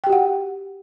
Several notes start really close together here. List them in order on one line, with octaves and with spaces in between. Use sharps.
G5 G4 F#4 F#5